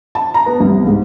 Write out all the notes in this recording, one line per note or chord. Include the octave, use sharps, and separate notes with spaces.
A5
A#5
B3
C2
G#2